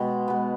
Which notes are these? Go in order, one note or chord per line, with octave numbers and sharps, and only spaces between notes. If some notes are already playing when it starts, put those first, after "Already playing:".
Already playing: B2 G#3 B3 G5
G#3 B3